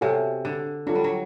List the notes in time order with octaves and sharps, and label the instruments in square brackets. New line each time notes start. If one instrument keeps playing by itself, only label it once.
[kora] C3 [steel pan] F#4 A4 C#5 F5 G#5
[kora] D3
[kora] F#3 [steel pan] D4 F4 A4
[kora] G3
F#3